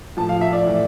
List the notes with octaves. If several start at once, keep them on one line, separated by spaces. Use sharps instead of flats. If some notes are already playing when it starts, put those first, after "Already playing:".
A2 F3 A5
F5
E5
D5
A2 E3